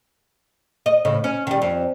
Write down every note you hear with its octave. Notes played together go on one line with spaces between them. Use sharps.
D#5
A2 C#3
C#4
D#3 G3
F2